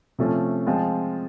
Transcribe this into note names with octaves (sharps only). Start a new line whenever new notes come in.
C3 F3 A3 C#4
F3 G#3 C4 F4